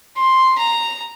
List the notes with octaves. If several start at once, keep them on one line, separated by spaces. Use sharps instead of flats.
C6
A#5